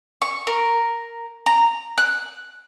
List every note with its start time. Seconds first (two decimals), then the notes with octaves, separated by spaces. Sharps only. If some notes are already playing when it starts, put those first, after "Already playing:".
0.22 C#6
0.47 A#4
1.46 A#5
1.98 F#6